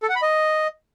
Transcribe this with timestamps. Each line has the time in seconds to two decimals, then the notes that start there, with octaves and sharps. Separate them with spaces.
0.03 A4
0.09 F#5
0.16 B5
0.22 D#5